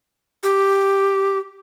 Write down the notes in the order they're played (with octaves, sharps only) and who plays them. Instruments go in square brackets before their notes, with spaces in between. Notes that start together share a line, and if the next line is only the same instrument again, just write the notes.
[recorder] G4